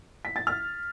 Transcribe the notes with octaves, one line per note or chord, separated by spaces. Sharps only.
B6
A6
F6